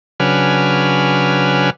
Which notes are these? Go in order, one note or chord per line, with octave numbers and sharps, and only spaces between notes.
C#3 F#3 D4 B4 G#5 F6